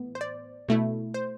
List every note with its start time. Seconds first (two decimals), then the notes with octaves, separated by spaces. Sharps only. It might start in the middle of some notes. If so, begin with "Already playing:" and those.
Already playing: A2 E3 B3
0.15 C5
0.21 D5
0.69 B2 A3 E4
1.14 C5